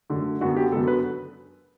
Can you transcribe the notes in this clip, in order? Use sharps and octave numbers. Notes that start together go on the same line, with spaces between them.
F#2 D3 A3
F#2 D3 F#3 B3 F#4
G4
F#2 D3 F#3 B3 A4
B4